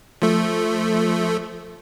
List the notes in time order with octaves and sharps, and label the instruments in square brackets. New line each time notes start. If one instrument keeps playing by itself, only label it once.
[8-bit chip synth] F3 A3